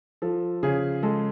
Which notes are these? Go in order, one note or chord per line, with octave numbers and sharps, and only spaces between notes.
F3 A4
C#3 G#4
G#3 A4